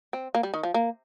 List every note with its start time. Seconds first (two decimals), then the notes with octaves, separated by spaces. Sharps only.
0.13 C4
0.35 A#3
0.43 G3
0.54 D#3
0.63 F3
0.74 A#3